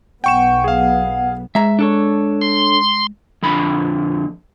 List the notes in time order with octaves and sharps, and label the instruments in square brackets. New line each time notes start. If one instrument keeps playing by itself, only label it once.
[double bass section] B1 B3 [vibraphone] F#5 [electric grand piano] G5 C#6 E7
[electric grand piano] G#4 F5
[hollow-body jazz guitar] G#3 A#5 [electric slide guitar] E5
[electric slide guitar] D4 A4 C#5
[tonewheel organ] C6
[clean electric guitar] F2 D3 B5